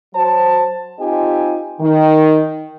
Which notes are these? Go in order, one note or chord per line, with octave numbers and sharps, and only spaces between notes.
F#3 C5 A5
C4 D#4 F4 G4 D#5 G#5
D#3